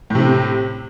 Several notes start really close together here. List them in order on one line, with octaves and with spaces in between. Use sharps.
A2 C3 C4